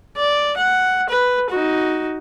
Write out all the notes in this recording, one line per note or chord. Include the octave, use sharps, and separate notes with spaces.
D5
F#5
B4
D#4 F#4